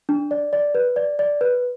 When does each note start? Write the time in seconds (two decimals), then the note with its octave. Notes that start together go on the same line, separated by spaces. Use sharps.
0.09 D4
0.31 D5
0.53 D5
0.75 B4
0.96 D5
1.19 D5
1.41 B4